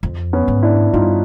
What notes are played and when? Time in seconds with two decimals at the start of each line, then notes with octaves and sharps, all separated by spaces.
0.03 F2
0.33 B3 C#4
0.48 G#2
0.63 D4 E4
0.93 G2 D#4 F4